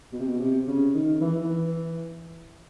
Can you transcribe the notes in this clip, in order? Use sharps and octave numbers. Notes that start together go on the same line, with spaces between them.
B2
C3
B2
C3
C#3
D#3
E3
E3